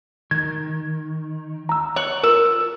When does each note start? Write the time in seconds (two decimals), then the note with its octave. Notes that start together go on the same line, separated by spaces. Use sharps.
0.31 D#3 G#6
1.69 A#5 E6
1.96 C#5 C#6 F#6
2.23 F4 A#4 E6